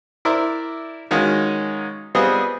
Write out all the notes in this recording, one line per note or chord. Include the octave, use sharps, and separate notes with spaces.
E4 A#4 C5 D5 E5 D6
D#3 G#3 C#4 D#4 F4 F#4
G3 B3 C4 F4 G#4 D#5